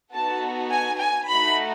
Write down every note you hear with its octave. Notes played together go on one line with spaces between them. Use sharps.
B3 D#4 F#4 A4 A5
G#5
G#5
A3 D#4 F#4 B5